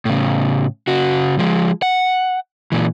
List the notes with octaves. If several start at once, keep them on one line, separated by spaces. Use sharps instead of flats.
A2 C#3
C#3 F#4
F3 G#3
F#5
A#2 E3